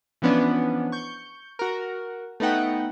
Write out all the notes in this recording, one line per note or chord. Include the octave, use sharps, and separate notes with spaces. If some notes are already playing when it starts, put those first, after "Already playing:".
E3 F3 B3 C#4 D4
C#6 G6
F#4 A#4
A3 B3 D#4 F#5 G5